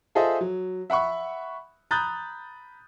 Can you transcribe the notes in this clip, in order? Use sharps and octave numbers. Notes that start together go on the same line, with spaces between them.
F4 G#4 A4 C5 D#5 E5
F#3
E5 F#5 B5 C#6
A#5 B5 D#6 F#6 G6 A6